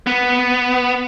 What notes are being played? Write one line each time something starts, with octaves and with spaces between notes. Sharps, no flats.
B3